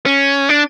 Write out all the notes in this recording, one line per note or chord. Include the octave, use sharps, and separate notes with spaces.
C#4
D4